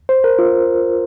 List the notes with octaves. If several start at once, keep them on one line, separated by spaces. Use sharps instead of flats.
C5
A#4
F4